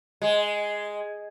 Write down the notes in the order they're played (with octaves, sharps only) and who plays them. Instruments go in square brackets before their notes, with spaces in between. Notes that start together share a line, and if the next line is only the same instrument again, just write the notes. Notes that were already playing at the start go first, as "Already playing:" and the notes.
[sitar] G#3